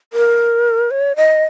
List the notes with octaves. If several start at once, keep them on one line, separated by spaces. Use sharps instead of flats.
A#4
C#5
D#5